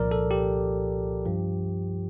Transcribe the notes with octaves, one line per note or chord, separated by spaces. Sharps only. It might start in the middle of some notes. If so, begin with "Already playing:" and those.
Already playing: C2 A#2 F3 A#4 D5
A4
G4
G2 F3